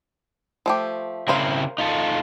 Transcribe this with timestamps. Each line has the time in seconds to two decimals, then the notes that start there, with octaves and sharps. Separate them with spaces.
0.66 F3 A3 G4
1.28 C#3 C4 E4 A#4 C5 F5
1.78 D#4 F4 A4